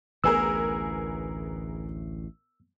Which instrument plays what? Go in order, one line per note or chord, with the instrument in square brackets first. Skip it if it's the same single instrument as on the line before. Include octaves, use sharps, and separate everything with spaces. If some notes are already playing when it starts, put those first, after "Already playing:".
[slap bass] A1 D2 A2 [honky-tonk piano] B3 G#4 A#4 [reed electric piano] E6